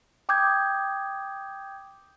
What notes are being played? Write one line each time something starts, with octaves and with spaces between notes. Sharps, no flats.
G5 D6 D#6 G6 G#6